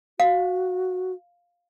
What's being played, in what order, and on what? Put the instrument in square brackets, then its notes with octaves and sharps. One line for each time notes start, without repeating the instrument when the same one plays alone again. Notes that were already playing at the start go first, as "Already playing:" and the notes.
[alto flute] F#4 [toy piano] F5